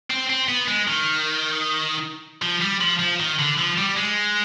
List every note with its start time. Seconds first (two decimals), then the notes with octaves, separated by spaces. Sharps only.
0.10 C4
0.30 C4
0.49 B3
0.68 G#3
0.87 D#3
2.42 F3
2.62 G3
2.81 F3
3.00 F3
3.20 D#3
3.39 D3
3.58 F3
3.78 G3
3.97 G#3